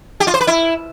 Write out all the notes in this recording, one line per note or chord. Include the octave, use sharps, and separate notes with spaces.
G4
F4
C5
B4
E4